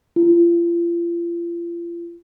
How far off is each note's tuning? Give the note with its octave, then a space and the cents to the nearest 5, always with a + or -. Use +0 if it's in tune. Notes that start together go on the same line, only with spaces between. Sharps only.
F4 -40